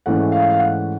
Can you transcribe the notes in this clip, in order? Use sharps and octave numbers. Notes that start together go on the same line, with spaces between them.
G#2 E3 A3 C#4 F#5
F5
F5
F#5